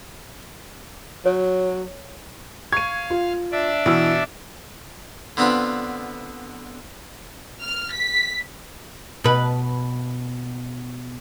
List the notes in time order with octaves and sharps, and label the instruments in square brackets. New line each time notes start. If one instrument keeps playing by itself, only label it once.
[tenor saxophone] F#3 [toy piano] C#5
[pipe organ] F5 [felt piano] C#6 D#7 [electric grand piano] G#6
[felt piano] F4
[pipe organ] D4 D5 E5
[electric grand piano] B2 [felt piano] E3 E6
[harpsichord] D3 B3 C4 D4 F4 B4
[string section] F6
B6
[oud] B2 B4